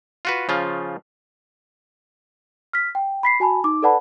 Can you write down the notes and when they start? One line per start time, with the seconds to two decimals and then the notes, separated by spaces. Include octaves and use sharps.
0.25 F4 F#4 B4
0.49 C#3 F3 F4
2.73 F6 B6
2.95 G5
3.23 B5 B6 C7
3.40 F#4 G#5 A5 B5
3.64 D#4 D6
3.83 A4 B4 D5 F#5 A5 B5